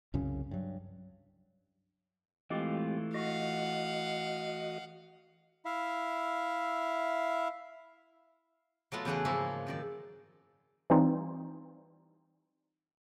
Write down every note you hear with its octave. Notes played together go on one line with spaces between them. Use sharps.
C2 F#2 C#3 C#4
G2 F#3
E3 G#3 A3 C4 F4 G4
F#4 D#5 F5 F#5
E4 E5 F5
F#3 A3 B3 F4
E2 C#3 E3 A3 G#4 F#5
G#2 F3 A#3 E4 C#5 A#5
F#2 D#3 D5
E3 G3 C4 D#4 F4